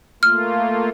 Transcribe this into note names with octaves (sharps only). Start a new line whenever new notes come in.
A3 A#3 F4 F6